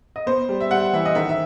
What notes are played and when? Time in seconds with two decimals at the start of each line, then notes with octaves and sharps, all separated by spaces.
0.16 D#5
0.26 B3 C5
0.49 G3
0.60 E5
0.71 G3 F#5
0.93 E3 E5
1.05 D#5
1.15 D#3 E5
1.29 E5